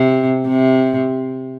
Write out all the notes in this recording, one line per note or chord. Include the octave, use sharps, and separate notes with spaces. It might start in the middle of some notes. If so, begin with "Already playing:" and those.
Already playing: C3
C3